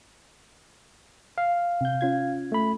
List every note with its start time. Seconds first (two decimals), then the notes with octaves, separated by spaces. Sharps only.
1.38 F5
1.81 C3 G6
2.01 C#4 F4 G#6
2.52 A3 B5